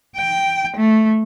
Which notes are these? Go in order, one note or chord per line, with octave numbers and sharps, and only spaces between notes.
G5
A3